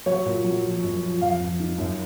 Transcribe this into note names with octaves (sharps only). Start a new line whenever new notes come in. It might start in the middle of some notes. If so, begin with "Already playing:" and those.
F#3 C#5
A#2
F#3
F3
F#2
F3
F2 F5
F2
D#3
F#2